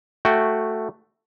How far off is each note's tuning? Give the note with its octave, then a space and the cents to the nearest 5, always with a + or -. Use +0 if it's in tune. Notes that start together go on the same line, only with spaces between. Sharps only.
A3 +5 F#4 +0 G5 +5